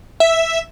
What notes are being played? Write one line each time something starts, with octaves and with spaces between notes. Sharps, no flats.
E5